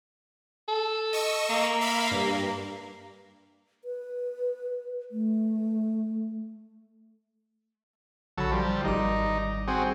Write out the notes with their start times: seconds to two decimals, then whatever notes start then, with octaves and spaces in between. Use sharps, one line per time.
0.68 A4
1.13 D#5 C#6 E6
1.50 A#3
1.81 E5 F5 B5
2.11 G2
3.84 B4
5.11 A3
8.38 A#1 D3 F#3 A4 B5
8.52 F3 G3
8.84 G#1 G3 D#4 D6
9.68 C4 F#4 G#4